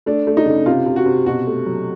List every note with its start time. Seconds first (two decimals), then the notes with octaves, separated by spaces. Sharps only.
0.06 A3 D4
0.27 A3
0.37 D#4
0.46 C#3
0.66 C3 F4
0.86 C3
0.96 F#4
1.06 C3
1.26 B2 F#4
1.47 A3
1.66 F#3